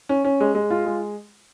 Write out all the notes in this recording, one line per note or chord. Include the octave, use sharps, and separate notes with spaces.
C#4
C#4
G#3
G#3
F4
G#3